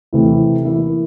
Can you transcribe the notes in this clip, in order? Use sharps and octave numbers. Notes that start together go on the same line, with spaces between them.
C3 E3 A3 E4
E3 A#3 E4